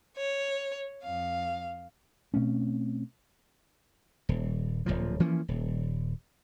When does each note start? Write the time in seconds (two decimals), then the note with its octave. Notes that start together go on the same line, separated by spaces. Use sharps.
0.17 C#5
1.02 F2 F5
2.34 B2 A3 C4 C#4
4.29 D#1
4.86 D1 B1 A#2 F3
5.20 E3 F3 A#3 C#4
5.48 D#1